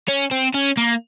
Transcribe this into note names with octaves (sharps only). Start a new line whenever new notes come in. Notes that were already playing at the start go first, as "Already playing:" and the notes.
C#4
C4
C#4
A#3